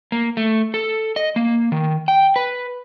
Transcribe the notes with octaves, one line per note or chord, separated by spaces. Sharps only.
A#3
A3
A4
D#5
A#3
D#3
G5
B4